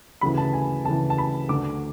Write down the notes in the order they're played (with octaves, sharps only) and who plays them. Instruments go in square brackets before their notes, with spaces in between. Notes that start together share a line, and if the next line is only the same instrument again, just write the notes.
[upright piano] D2 C#3 E3 B5
A5
G#5
D2 C#3 E3 A5
A5
B5
D2 D3 D6